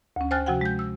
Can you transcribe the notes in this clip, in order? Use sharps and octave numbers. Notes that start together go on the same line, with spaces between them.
D2 C#4
C5 G5 G#5 F6 F#6 A6
C3 F3 F#4 F#5 G5
G#3 G6
E6